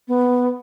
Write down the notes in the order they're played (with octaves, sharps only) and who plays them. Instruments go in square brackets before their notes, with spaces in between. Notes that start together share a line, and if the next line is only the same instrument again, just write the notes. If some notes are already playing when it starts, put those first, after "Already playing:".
[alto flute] B3